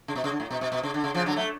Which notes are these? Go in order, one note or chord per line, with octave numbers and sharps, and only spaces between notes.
C#3
B2
C#3
D3
A2
B2
B2
B2
C#3
D3
C#3
C#3 F3
D3 F#3
F#3 A3